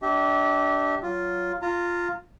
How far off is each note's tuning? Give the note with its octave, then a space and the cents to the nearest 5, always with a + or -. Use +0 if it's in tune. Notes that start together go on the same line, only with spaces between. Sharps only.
D4 -10 G4 -25 E5 -35
F#3 +10 F4 +0
F4 +0 A#5 -30